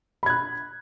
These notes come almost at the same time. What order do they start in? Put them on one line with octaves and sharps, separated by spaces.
B5 G#6 F#6